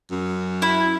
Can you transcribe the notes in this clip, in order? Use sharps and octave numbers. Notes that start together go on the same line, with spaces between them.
F#2
E4